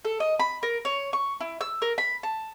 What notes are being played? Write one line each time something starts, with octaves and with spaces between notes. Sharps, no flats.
A4
D#5
B5
A#4
C#5
C#6
E4
E6
A#4
B5
A5